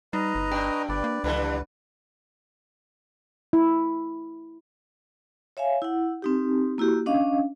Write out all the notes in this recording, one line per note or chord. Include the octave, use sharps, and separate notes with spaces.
G3 D#4 B4 D#5 A#5
G1
G2 D4 G5
G1 B4 D5
A#3
C#2 G2 D3 E3 B4
E4
C#5 E5 F5 G#5
E4 F#5
C4 D#4 G4
A#3 E4 F#4 G4
C#4 D4 D#5 F5